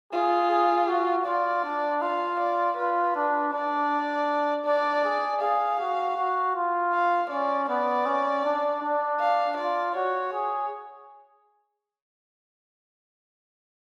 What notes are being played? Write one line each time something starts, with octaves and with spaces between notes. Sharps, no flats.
F4 G#4
G#4
F#4
F4 D5
D4
F4 F5
D5
F4 B4
D4
D4 D5
D4 D5
G#4
G#4 F5
F#4
F#4
F4
F5
C#4 D5
B3 D5
C#4
D4
D4
F5
F4 D5
F#4 C#5
G#4